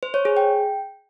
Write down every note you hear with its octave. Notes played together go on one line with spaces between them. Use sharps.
C5
C#5
G#4
G5